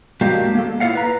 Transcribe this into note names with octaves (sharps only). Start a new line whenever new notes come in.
G#3 A#3 D4 F#4 G4 F5
A#3 A4
E4 F4 A4 D5 F5 F#5
B4 A#5